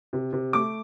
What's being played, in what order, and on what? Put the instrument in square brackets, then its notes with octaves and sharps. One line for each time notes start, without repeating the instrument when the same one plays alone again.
[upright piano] C3
C3
A3 D6